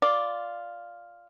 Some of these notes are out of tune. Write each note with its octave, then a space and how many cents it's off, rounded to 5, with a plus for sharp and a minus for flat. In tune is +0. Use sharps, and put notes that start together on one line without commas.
F4 +0 D5 -5